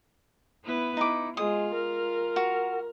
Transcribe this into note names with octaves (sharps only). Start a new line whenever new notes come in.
B3 E4 B4
D#4 E4 D6
G#3 F4 D#6
A#4
F#4